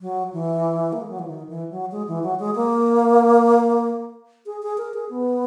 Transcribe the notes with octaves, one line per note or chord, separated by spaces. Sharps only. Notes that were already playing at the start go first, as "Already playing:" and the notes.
F#3
E3
A#3
G#3
F#3
E3
D#3
E3
F#3
G#3
E3
F#3
G#3
A#3
G#4
G#4
A#4
G#4
B3